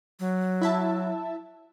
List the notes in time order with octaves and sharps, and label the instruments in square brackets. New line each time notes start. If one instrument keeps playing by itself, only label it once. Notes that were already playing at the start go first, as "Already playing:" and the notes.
[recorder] F#3
[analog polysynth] E4 E5 A5